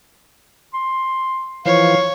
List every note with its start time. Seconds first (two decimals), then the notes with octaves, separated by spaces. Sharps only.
0.74 C6
1.66 E3 F3 C#5 F5